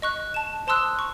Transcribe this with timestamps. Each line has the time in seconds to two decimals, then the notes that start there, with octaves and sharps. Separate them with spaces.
0.02 D#5 C#6 F#6
0.34 A5 E7
0.67 C5 A5 C6 D#6 E6 F#6
0.99 C#6